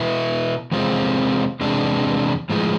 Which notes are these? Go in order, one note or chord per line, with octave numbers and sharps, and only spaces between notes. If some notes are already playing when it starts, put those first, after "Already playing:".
Already playing: B2 B3 E4
E2 C3 G#3 C4 F4
E2 C3 G#3 D4
A2 F3 G#3